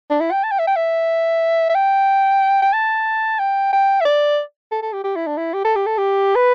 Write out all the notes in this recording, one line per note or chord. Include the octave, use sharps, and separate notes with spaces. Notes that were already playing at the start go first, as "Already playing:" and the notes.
D4
E4
G5
A5
G5
E5
G5
E5
E5
G5
G5
A5
G5
G5
E5
D5
A4
A4
G4
G4
E4
D4
E4
G4
A4
G4
A4
G4
B4